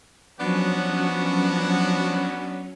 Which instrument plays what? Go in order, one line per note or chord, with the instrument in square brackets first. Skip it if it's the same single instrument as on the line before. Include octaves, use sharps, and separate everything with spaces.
[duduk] F3 [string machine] F#3 C#4 [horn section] B3 D4 F#4